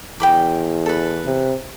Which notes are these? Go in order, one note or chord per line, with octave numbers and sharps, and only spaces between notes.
E2 G5 B5 D6
A4 B4
C3